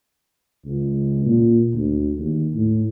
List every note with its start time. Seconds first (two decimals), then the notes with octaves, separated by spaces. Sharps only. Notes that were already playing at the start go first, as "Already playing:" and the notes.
0.65 C#2
1.25 A#2
1.74 D2
2.19 D#2
2.54 A2